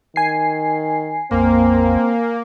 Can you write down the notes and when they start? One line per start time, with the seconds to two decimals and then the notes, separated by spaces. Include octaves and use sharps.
0.16 D#3 G#5 C7
1.31 A#1 F2 A#3 C4